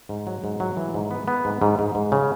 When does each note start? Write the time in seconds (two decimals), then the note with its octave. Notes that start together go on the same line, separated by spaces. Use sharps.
0.09 G#2
0.27 F#3
0.44 G#2
0.60 F#3
0.77 E3
0.94 G#2
1.11 B3
1.28 B3
1.45 G#2
1.61 G#2
1.79 G#2
1.95 G#2
2.12 C#3